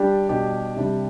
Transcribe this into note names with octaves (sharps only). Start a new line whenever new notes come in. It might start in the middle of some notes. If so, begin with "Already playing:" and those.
Already playing: G3 D4 G4
B2 G3 D4 G4
C3 G3 D4 G4